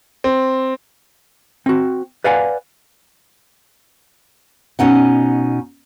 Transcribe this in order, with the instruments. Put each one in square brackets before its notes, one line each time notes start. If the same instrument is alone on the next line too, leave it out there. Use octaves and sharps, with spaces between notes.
[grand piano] C4
[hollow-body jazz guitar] C4 F#4
B4 D5 F5 F#5 G#5
[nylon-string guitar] B2 C#4 D#4 F#5